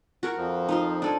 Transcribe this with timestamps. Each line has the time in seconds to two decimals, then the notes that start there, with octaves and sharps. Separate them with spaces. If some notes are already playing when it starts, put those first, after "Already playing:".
0.23 F#4 A#4 C#6
0.37 F2 F3
0.69 D#4 F4 C5
1.02 D4 A4 G#5